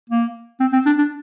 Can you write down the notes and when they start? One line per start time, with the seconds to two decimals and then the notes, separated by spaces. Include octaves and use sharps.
0.10 A#3
0.60 C4
0.73 C4
0.86 D4
0.98 D4